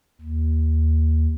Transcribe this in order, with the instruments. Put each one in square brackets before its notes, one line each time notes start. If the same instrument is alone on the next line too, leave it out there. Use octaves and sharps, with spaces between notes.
[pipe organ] D#2